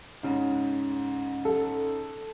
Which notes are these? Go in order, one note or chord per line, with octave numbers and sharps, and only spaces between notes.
G#2 C#3
A4